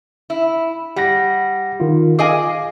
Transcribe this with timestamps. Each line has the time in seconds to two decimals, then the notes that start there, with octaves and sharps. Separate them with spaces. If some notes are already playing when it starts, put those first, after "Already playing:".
0.30 E4
0.96 G3 G4 F#5 A#6
1.80 D#3 F4
2.19 G#4 D#5 F5 G#5 D6